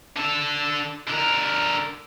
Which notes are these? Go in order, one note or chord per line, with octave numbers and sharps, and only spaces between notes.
D3 A4
D3 A#4